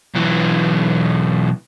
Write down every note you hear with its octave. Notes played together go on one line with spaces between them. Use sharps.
B1 E3